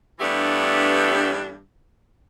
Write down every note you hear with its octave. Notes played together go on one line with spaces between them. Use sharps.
G2 E3 A3 B3 D4 G4